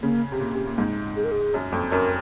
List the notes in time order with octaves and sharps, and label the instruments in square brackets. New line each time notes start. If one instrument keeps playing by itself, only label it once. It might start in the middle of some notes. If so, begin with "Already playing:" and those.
[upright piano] C#3 [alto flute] A#3
[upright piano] C3
A#2
C3
A#2
G#2
[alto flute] G#4
A#4
G#4
[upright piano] F#2
F2
[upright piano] F#2 [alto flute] A#4